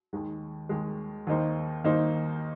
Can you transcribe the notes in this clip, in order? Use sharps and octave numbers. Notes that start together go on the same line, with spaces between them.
D#2 D#3 G#3
D#2 D#3 G#3
D#2 D#3 A#3 D#4 C5
D#2 D#3 A#3 D#4 C5